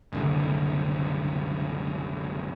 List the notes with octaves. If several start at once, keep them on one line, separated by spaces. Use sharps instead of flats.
F#1 C2 D3